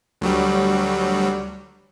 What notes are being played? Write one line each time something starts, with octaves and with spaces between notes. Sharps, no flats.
D2 F#3 G3